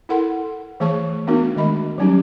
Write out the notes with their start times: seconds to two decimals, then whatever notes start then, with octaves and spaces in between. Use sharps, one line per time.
0.09 E4 A4 A#4 F#5 C6
0.80 E3 A3 G#4 C#5 A5 C#6
1.27 A3 B3 D4 D#4 F#4 A#4
1.56 D#3 G#3 D#5 B5
1.98 F#3 G3 C#4 D#4 G4